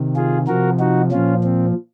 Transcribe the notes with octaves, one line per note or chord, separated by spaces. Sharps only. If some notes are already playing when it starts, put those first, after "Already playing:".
Already playing: C3 D#3
F4 G#4
C3 F3 F#4 A#4
D#4 F#4
A#2 F3 C#4 F4
C4